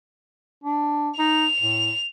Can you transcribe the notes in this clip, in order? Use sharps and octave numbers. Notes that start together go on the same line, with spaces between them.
D4
D#4 F7
A2